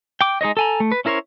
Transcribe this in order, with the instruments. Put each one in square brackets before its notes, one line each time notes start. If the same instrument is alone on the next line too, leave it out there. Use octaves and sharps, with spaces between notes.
[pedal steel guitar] G5 D6
G#3 D#4 C#5 D#5
A4 G#5 A#5
A3
B4
C#4 E4 A#4 C5 C#5